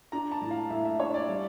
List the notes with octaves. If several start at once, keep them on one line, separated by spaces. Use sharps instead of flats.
D4 A#5
A5
A2
F5
A2 E5
E5
D4 C#5
D5
G3